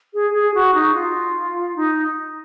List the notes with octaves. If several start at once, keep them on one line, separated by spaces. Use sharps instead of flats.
G#4
G#4
F#4
D#4
F4
D#4